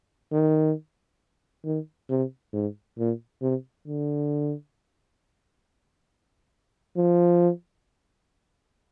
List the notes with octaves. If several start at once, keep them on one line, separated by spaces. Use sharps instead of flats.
D#3
D#3
C3
G#2
A#2
C3
D3
F3